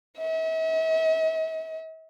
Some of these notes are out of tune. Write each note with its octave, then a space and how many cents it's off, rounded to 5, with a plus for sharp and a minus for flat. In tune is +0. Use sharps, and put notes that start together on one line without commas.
E5 -45